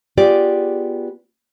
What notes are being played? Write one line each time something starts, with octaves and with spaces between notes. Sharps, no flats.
B3 F4 G4 G#4 D5